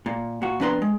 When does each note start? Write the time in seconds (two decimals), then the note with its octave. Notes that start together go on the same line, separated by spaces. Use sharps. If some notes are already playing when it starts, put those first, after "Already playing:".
0.06 A#2
0.42 A#2 F#4
0.60 F2 B3 D4 B4 A#5 C6
0.82 G#3